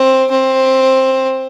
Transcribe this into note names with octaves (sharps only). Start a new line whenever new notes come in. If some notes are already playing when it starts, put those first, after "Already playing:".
Already playing: C4
C4